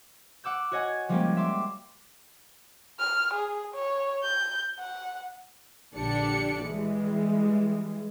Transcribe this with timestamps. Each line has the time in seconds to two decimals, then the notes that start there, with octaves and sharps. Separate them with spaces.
0.44 F#5 D6 E6 G6
0.71 F#4 C#5 D#5 F#5 G#5
1.09 F3 G3 G#3 A#3 C#4 G4
1.37 E5 C6 D6
3.00 F6
3.34 G#4
3.75 C#5
4.24 G6
4.80 F#5
5.94 A#1 D3 D4 G4 D5 C#7
6.65 E3 G3 G#3